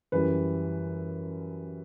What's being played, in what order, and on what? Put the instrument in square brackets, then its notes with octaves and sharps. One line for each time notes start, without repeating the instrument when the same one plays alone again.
[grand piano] F#2 E3 G3 B4